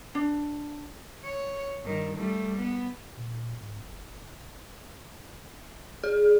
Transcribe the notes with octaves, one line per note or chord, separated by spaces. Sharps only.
D4
C#5
G2 D#3
G3 A3
B3
A#2
G#2
F#1
G#4